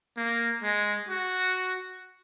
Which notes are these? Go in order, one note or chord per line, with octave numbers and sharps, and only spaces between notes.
A#3
G#3
F#4